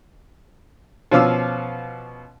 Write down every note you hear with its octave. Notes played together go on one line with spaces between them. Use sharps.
B2 F3 C#4 F5 D6 E6